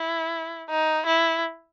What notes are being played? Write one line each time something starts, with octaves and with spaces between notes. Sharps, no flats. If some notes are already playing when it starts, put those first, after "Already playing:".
Already playing: E4
D#4
E4